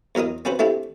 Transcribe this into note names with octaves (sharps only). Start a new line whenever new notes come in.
E2 F#3 A#4 D#5 D#6
C4 C#4 F#4 B4 C5
A3 C4 D4 E4 G4